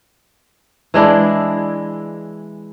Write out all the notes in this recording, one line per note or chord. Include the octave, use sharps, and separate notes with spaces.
E3 G#3 D4 E4